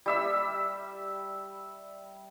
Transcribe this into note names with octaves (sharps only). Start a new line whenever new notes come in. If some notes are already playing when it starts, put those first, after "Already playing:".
G3 E5 E6